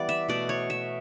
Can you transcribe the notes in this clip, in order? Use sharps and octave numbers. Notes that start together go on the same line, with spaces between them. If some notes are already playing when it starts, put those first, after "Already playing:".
Already playing: E3 G3 B3 D5
E5
B2 A3 D5
C#5
E5